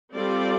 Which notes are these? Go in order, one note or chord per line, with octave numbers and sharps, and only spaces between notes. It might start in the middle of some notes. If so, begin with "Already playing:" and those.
G3 C4 F4 A4 D5